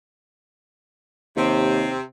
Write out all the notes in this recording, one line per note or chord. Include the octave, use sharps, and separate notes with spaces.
D#2 C3 C4